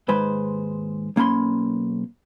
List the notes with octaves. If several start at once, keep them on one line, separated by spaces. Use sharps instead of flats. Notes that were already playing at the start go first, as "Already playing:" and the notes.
D#2 G#2 G#3 B4 C5 B5
B1 A#3 C#4 B5 C6